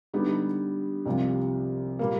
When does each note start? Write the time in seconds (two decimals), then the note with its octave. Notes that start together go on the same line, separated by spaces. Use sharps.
0.14 D3 G3 B3 D#4 G4
1.06 C2 C3 F3
1.99 A#2 G3 A#3